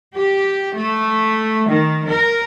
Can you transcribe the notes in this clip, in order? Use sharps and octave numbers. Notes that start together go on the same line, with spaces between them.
G4
A3
D#3
A#4